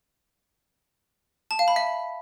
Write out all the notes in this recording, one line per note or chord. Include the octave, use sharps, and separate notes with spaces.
A5
F5
B5
E5